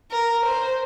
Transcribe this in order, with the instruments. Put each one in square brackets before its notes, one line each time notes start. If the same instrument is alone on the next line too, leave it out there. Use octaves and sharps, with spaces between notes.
[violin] A#4
C5